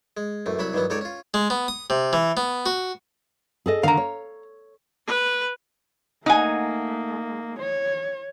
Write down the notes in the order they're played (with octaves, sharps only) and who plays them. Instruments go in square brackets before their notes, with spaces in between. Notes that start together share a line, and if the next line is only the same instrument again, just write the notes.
[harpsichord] G#3
A1 F#2 A3
C2 F#3 F#4 E5 B5
G2 D#3 E3 F#3 B3
C#2 D#4 A4 C#5 D5
C#4 F4
G#3
B3
D#6
C3
E3
B3
F#4
[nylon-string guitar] G#4 A4 D#5
[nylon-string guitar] D3 D#3 [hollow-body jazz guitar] F5 A#5
[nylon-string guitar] C#5
[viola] B4
[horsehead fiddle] A3 A#3 [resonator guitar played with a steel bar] D#4 F#5 G#5
[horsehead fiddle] C#5